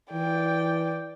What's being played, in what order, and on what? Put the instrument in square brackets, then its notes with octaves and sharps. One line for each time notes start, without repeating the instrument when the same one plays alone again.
[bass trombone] E3 [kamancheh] D5 G5